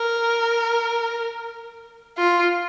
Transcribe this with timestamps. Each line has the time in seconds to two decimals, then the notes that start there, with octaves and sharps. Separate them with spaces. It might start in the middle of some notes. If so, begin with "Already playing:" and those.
Already playing: A#4
2.18 F4